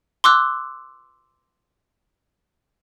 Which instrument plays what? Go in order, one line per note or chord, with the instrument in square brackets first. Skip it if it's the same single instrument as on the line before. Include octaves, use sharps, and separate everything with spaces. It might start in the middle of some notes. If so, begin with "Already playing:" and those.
[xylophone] C6 D6 E6 F#6